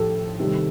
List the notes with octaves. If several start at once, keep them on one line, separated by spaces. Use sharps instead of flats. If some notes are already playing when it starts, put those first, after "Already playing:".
Already playing: A2 F3 G4 A4
C3 D#3 G3